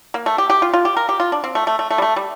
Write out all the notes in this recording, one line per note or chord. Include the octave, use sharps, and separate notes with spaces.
A#3
A3
G4
G4
F4
F4
G4
A#4
G4
F4
D4
C4
A3
A3
A3
A3
G3
A3
G3